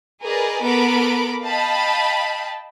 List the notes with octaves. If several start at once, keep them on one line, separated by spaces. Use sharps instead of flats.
G#4 A#4 B4 D5 D#5
B3 A4 A#4 B5 D6 D7
D#5 F5 G5 A5 B5